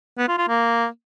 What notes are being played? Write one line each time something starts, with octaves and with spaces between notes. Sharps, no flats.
B3
F4
F4
A#3